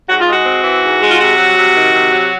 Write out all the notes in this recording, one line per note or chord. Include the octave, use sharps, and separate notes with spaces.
G#2 F#4
F4
G#3 F#4
C4
E3
G#2
G#3
F4
C3 F#4
F#3
C3
D#3
C3
F#3